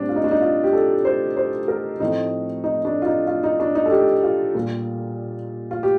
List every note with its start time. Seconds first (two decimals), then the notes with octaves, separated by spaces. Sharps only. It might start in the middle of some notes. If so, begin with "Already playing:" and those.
Already playing: A2 G3 C4 D4
0.09 F4
0.16 D#4
0.24 D4
0.31 D#4
0.41 F4
0.64 G4
0.73 A4
1.05 C5
1.37 C5
1.68 A#4
2.00 A2 F3 A3 C4 D#4
2.64 D#4
2.85 D4
3.02 F4
3.06 D#4
3.27 F4
3.43 D#4
3.60 D4
3.75 D#4
3.86 A4
3.91 G4
4.23 F4
4.55 A#2 G3 A#3
5.71 F4
5.83 G4